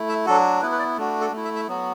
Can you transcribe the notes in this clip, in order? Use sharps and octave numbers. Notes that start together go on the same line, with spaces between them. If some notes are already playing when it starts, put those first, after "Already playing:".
Already playing: A3 E4
E5
F#3 D4 F#4 A4
B3 E4 B4
B4
D5
A3 D4 F#4
A4
A3
E4
E5
E5
F#3 B3 F#4